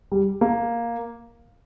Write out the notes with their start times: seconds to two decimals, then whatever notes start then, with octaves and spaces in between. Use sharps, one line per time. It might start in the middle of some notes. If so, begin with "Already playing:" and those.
0.12 G3
0.41 A#3